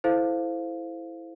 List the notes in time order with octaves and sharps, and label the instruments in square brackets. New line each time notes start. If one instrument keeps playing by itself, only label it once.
[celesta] E4 A4 C5 F5